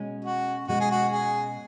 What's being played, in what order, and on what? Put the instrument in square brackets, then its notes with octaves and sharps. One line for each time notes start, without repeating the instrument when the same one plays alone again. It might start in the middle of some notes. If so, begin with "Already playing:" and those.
Already playing: [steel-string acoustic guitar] B2 G#3 C#4
[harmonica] F#4
[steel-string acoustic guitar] B2 G#3 C#4 [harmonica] F#4
[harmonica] G#4
F#4
G#4